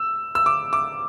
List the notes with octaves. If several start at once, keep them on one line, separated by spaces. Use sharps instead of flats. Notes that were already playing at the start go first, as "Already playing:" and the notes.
Already playing: E6
E6
D6
D6